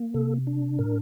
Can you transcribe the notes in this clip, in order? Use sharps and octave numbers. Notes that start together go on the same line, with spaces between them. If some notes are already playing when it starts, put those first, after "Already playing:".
Already playing: A#3
C3 A4
D4
A2 A#4